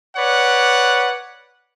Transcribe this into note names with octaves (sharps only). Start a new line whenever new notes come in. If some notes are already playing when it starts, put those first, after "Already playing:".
B4 C#5 D5 F#5